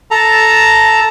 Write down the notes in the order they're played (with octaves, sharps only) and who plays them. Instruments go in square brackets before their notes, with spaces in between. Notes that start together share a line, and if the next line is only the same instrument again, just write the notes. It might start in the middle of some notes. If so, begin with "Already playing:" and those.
[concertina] A4 A5 A#5